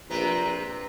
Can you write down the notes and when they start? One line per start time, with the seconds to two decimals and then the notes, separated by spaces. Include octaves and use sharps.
0.10 A#1 C3 C4 B4 A#5